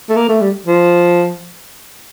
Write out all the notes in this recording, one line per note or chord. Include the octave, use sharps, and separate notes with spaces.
A3
A#3
A3
G3
F3